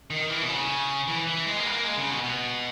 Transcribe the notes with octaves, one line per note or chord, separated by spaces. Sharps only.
D#3
E3
B2
C#3
E3
E3
G#3
A#3
B3
A#3
G#3
C#3
B2
B2